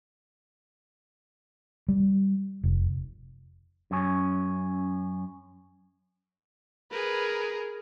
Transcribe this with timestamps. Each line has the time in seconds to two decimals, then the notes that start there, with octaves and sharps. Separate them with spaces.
1.88 G3
2.64 F1
3.91 F#2 C#4
6.92 G#4 A#4 B4